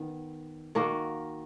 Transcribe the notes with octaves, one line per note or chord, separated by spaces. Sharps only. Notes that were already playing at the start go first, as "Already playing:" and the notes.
Already playing: D#3 B3
D#3 A#3 D#4 F#4